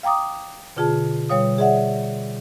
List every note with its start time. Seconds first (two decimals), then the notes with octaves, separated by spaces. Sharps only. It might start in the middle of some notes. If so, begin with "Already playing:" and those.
0.03 F5 G5 A#5 D6 D#6
0.76 B2 D3 F4 G#4 A5
1.29 B2 G3 C#5 F5 D#6
1.58 G#4 D5 E5 F#5